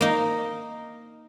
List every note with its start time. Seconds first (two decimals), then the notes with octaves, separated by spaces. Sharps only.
0.01 A#3 D#4